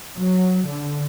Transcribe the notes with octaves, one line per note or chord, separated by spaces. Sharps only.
F#3
D3